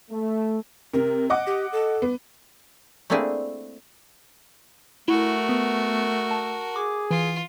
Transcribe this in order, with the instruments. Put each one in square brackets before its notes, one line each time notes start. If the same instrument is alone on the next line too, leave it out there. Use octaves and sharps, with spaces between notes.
[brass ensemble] A3
[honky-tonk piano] C3 [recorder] A#4
[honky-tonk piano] D#5 F#5 D6
[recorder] G4
A4
[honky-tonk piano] B3
[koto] A3 A#3 C4 D4 E4 G#4
[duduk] A3 [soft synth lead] E4 [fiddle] F#4 A#4
[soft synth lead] B3
A5
[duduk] G#4 [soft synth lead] D6
[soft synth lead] E3 [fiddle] F4